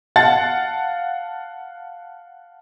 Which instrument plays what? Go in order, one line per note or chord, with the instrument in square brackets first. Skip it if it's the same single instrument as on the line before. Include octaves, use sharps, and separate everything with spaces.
[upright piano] F5 F#5 A5 A6